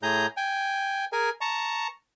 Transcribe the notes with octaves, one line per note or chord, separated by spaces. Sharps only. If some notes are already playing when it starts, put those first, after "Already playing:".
A2 G#4 A#5 G6
G5 G#5
G#4 A#4 G#5
A5 A#5 C#6